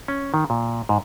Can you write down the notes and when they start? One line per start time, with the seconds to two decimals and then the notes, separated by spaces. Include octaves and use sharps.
0.08 C#4
0.34 D#3
0.50 A#2
0.89 G#2